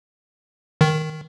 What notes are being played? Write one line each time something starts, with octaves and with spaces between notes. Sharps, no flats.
D#3